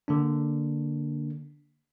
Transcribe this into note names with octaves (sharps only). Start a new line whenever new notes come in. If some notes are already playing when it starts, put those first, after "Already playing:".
D3 A#3 D4